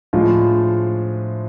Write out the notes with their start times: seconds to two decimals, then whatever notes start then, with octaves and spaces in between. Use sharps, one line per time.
0.13 A2 F3 G#3 D4 F4